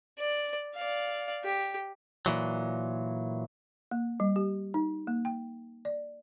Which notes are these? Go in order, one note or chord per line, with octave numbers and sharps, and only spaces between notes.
D5
D5 F5
G4
A#2 E3 F#3
A#3
G3
G4
D#4
A#3
G5
D5